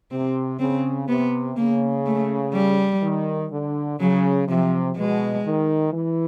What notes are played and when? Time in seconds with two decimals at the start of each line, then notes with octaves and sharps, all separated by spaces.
0.11 C3 C4
0.60 C#3 C4
1.09 C3 B3
1.57 C#3 A#3
2.06 A3
2.54 G3
3.03 D#3
3.52 D3
3.99 C#3 F#3
4.48 C3 F3
4.96 B2 G#3
5.45 D#3
5.93 E3